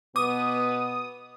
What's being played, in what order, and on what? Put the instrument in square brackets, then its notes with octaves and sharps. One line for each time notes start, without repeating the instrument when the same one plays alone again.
[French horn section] B2 B3 [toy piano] D6 [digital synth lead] D#6